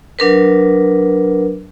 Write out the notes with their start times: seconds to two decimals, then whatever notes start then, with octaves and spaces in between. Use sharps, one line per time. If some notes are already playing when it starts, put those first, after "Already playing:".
0.19 F#3 D4 A#4 B4